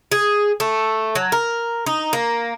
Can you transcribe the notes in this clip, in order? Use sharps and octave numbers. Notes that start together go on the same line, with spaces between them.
G#4
A3
F#3
A#4
D#4
A#3